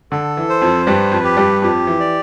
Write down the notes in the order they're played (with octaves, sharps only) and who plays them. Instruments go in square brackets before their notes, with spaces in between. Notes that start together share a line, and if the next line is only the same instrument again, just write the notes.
[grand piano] D3 [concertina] A4
[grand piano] E3
[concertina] C5
[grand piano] F2 F3
[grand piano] G2 G3 [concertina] B4
[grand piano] F2 F3
[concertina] G4
[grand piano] G2 G3
[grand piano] F2 F3 [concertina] G4
[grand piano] E3
[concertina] D5